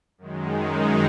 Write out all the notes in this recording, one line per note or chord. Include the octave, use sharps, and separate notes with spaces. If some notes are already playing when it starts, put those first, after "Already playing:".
F#2 D#3 G#3
D#4